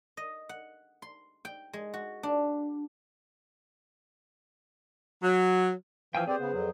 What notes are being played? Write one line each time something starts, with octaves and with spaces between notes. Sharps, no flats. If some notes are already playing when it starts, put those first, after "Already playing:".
D#5
F#5
C6
G5
G#3
F#4
D4
F#3
E3 F3 F5 G5 G#5 E6
C4 G4 G#4 B4 C5 D5
C#3 B3
F2 F#3